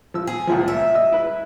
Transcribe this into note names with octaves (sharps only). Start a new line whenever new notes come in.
F3 E6
G#4
C#2 A#2 F3
E5
D#5 E6
E4 B4